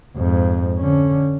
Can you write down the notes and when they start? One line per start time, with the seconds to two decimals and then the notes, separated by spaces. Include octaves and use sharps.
0.17 F2 G#2
0.79 D3 C#4